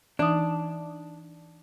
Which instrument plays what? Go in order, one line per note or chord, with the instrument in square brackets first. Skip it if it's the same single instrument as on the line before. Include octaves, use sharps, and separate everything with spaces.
[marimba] E3 D#4 D#6 [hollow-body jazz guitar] D4